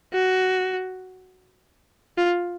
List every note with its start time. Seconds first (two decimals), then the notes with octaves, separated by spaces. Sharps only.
0.13 F#4
2.18 F4